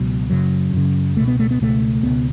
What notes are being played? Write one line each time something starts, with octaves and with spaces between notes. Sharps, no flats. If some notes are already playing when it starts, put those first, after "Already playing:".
Already playing: C#2 B2 F#3
F#2 C#3 F#3
F#2 C#3
C#2 B2 A3
B3
A3
B3
C#2 B2 A3
C#2 B2 B3